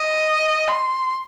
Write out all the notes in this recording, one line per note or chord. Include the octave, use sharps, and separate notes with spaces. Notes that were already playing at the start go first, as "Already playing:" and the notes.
Already playing: D#5
C6